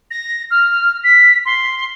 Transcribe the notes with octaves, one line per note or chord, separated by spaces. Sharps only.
A#6
F6
B6
C6